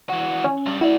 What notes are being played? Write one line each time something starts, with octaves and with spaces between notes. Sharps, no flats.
E3 F#4
C#4
G2 G3
E4 F#4 D5